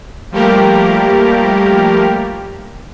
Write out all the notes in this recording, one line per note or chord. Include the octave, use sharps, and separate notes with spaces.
F3 G3 A3 A#3 G4 A#4